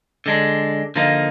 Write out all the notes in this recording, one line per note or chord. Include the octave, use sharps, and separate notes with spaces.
D3 G#3 D4
D3 F3 A#3 D#4